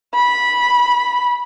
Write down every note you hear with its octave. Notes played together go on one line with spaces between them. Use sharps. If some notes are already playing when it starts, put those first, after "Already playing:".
B5